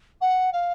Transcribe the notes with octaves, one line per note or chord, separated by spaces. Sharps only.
F#5
F5